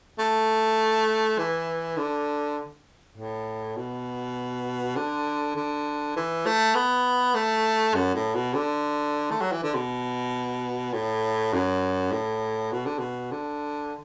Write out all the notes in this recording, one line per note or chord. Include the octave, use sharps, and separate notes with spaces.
A3
E3
D3
A2
B2
D3
D3
E3
A3
B3
A3
F#2
A2
B2
D3
A3
F#3
E3
D3
B2
A2
F#2
A2
B2
D3
B2
D3